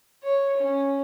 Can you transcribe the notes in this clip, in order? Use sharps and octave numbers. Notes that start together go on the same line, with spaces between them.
C#5
C#4